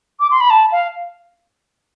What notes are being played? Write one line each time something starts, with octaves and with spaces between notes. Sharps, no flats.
D6
C6
B5
A5
F5